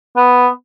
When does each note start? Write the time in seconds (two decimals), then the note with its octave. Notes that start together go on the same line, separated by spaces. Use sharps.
0.16 B3